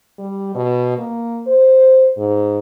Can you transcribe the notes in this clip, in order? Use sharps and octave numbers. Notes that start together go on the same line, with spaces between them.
G3
B2
A#3
C5
G#2